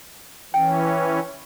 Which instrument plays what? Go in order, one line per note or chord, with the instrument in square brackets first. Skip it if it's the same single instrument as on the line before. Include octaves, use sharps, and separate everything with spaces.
[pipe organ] E3 C#4 [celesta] G5